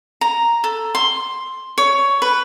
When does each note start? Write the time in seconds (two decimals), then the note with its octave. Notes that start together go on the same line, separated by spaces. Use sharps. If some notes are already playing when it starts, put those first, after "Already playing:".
0.21 A#5
0.64 A4
0.95 C6
1.78 C#5
2.22 B4